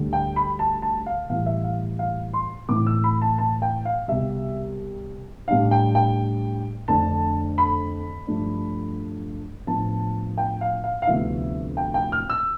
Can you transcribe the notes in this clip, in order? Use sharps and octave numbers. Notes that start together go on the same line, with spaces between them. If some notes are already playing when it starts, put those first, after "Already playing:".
Already playing: D2 D3 G3
G5
B5
A5
A5
F5
A2 E3 G3 F5
E5
F5
F5
C6
A2 E3 A3 C4 E4 D6
E6
B5
A5
A5
G5
F5
C2 B2 G3 E5
A2 G3 D4 F5
G5
G5
F2 D3 A3 D4 A5
B5
G2 F3 A3 D4
A2 F3 B3 D4 A5
G5
F5
F5
F5
D2 C3 F3 B3 E4 E5
G5
G5
F6
E6